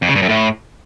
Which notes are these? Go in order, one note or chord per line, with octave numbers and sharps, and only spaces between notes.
F2
C#3
G2
F#2
A2